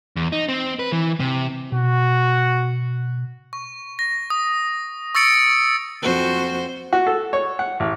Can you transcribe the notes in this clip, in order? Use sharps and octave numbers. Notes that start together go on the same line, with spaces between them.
E2
D#4
C4
B4
E3
C3
B2 F#4
C#6
A#6
D#6
C#6 E6 A6 C#7 D7
F2 F#4 C5
F#4
A4
C#5
F#5
A1